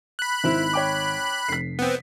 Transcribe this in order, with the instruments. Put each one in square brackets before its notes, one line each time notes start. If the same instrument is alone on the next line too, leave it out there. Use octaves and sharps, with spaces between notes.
[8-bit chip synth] B5 F#6
[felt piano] G#1 [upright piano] E4 C5
[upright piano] C#5 G5 D6
[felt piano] F1 B6 [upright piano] C7
[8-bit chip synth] B3 C4